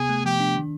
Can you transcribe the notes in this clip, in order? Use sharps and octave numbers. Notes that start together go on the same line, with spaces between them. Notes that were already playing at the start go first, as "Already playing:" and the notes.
Already playing: C3 B3 G#4 G#5
A3
F3 G4 G5
D4
D#3